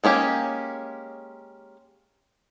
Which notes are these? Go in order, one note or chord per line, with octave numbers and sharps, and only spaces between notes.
G#3 A#3 C#4 G4